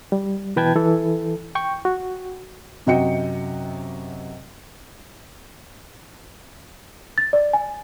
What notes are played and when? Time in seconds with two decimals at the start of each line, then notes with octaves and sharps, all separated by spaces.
0.12 G3
0.56 B2 E3 B4 G5 A5 G#6
0.76 E3 A4
1.55 G5 C#6
1.85 F#4
2.86 F#2 C3 F#4 D#5 G5 C#7
7.18 A6
7.33 D5
7.53 G#5